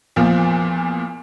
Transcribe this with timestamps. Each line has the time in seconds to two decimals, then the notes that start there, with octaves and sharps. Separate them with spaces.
0.16 E2 A#2 F3